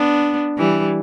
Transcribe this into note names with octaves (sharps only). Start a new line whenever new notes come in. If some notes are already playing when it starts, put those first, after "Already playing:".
Already playing: B3 D4
E3 G3